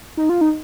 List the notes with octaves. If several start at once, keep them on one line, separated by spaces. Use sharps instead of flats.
D#4
F4
D#4